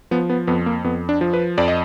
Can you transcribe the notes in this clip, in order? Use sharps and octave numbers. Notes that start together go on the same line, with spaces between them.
F3 B3
B3
F2 B3
A#3
F2 B3
D4
F3
B4
F2 D5
D#5